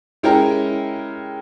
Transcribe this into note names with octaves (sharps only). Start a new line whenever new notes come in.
G#3 C#4 E4 G4 A#4